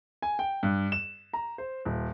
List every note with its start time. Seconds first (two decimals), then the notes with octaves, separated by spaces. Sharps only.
0.22 G#5
0.39 G5
0.63 G2
0.92 E7
1.33 A#5
1.58 C5
1.85 D#1